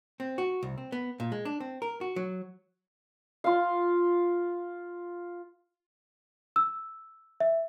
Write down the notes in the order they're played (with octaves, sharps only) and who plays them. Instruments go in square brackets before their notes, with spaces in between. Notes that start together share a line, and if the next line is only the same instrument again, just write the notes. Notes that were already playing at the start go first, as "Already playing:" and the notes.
[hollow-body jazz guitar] C4
F#4
C2
C4
B3
A#2
G#3
D4
C4
A#4
F#4
F#3
[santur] F4 F5
[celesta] E6
E5